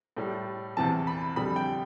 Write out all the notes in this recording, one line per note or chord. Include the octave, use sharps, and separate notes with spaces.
A2 G3
E2 C3 E3 A5
B5
F2 D3 G3 B5
G5